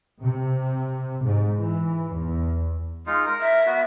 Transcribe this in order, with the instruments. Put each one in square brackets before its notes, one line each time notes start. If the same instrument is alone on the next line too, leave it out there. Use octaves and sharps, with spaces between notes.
[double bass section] C3
G#2
E3
E2
[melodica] G#3 D#4 F4
A#4
[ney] E5
[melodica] B3 F#4